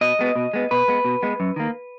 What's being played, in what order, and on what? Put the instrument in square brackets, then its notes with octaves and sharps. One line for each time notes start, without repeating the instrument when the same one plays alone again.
[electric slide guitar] B2 D#5
G#3 B3
B2
G#3 B3
B2 B4
G#3 B3
B2
G#3 B3
F#2
D#3 A#3